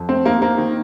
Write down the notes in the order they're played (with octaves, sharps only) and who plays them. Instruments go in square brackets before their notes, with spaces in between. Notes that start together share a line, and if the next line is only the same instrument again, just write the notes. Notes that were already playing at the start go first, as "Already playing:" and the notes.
Already playing: [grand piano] F2
[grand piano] A3 [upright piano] C4
[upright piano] A#3 [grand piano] D#4
[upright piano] A#3 [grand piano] C4
[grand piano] D#3